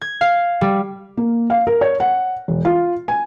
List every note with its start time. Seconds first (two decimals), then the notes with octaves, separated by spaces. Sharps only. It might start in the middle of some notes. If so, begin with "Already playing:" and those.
0.01 G#6
0.21 F5
0.61 G3
1.17 A#3
1.50 F5
1.67 A#4
1.81 C#5
2.00 F#5
2.48 E1
2.65 F4
3.08 G#5